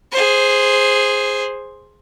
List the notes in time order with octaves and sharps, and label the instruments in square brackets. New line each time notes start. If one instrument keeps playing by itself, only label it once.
[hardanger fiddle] G#4 C5